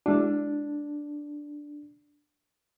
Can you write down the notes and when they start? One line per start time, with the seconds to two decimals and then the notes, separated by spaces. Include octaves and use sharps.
0.06 G#3 D4 E4 F#4